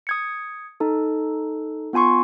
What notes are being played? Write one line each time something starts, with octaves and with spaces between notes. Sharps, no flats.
D#6 G#6 C#7
D#4 A4
B3 F4 G#5 C6 C#6